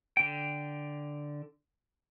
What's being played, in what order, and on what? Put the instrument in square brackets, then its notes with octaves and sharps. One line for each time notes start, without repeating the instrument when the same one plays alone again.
[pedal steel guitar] D3 G5